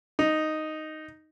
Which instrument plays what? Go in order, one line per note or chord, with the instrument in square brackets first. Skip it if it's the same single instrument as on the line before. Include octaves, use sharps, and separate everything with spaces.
[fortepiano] D#4